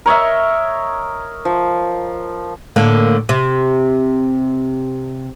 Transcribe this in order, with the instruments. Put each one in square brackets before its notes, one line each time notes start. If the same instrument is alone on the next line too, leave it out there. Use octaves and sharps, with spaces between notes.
[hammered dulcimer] A#4 C#5 D#5 E5
F3
[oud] A2 D3 A#3
C3